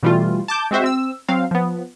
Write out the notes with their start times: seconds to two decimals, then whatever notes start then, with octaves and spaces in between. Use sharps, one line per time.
0.03 B2 E3 G3 A3 F4
0.48 A5 D6 G6
0.71 G#3 C4 F#4 C5 E5
0.84 C4 E6
1.28 F#3 C4 F5
1.51 F3 B3